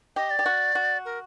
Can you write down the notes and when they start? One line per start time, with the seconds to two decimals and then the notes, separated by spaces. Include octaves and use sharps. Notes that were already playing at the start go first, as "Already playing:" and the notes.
0.16 G4 D#5
0.30 D5
0.39 G4
0.46 F#4
0.75 F#4
1.05 A#4